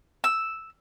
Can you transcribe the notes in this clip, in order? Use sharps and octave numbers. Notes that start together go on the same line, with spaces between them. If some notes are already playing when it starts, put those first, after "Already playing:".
E6